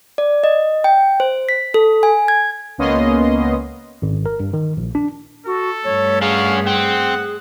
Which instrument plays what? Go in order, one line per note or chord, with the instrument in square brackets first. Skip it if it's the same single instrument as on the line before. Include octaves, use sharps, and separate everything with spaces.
[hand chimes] D5
D#5
G5
C5
B6
A4
G#5
G#6
[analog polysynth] C#2 A#3 B3 C#4 D#5 C6
[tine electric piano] G#1
A#4
G2
D#3
A#1
D4
[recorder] F#4 [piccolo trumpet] A4
[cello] G2 A3 [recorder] C#5
[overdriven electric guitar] C#4 F#4 [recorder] G#4 [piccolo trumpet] F5
[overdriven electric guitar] C4 [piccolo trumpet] F#5